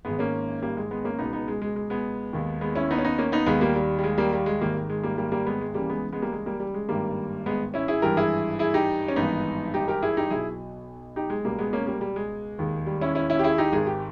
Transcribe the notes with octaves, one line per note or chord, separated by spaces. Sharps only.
G#1 G#2 D#3 G#3 B3
A#3 C#4
G3 A#3
G#3
G#3 B3
A#3 C#4
C#2 B2 B3 D#4
B3 D#4
G#3
G#3
G#3
G#3 B3
D#2 D#3
G#3 B3
C#4 E4
B3 D#4
C#4
B3 D#4
A#3 C#4
B3 D#4
D#2 D#3 G#3 B3
G3 A#3
G3
G3
G#3
G3 A#3
G3
G#3
G#1 G#2 D#3 G3 A#3
G#3
G3 A#3
G3 A#3
G3 A#3
G#3 B3
G#3
C#2 C#3 E3 G3 A#3
G#3 B3
G#3 B3
G3 A#3
G#3
G3 A#3
G3
G#3
G#1 G2 D#3 G3 A#3
G#3 B3
C#4 E4
E4 G#4
G#1 G2 E3 G4 A#4
E4 G#4
E4 G#4
D#4 G4
C#4
G#1 G2 E3 B3 D#4
D#4 G4
G4 A#4
E4 G#4
D#4 G4
B1 B2 E4 G#4
D#4 G4
G#3
C#2 B2 G3 A#3
G#3 B3
A#3 C#4
G3 A#3
G3
G#3
E1 D#2 D#3
G3
C#4 E4
C#4 E4
C#4 E4
G4
E4 G#4
D#4 G4
G#1 G#2 D#3 G#4
G4